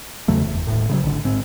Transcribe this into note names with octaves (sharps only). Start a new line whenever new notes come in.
E2 C#3 F#3 A3
F#1 E2
D#1 A2
C#3 F3 F#3
A1 D3
G#2 C4